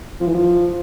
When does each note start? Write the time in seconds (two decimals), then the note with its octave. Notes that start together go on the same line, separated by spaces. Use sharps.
0.20 F3
0.27 E3
0.34 F3